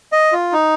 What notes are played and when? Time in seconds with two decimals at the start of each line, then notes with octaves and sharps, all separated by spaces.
0.12 D#5
0.32 F4
0.53 D#4